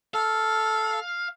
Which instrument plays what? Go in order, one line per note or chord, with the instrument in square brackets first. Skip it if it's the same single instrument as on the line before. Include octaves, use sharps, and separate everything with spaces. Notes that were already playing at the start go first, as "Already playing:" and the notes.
[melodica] A4 [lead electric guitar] F5